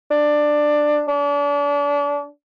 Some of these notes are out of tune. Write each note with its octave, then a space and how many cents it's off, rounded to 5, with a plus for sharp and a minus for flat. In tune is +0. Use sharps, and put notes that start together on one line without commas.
D4 +15
D4 -35